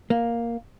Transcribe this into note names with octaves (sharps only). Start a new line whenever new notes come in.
A#3